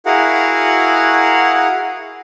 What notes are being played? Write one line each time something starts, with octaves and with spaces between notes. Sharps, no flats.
E4 F#4 G#4 A#4 F5 F#5